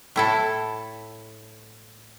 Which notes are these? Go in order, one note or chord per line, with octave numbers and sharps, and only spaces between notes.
A2 E4 A4